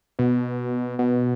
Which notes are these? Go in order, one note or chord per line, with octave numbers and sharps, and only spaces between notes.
B2
B2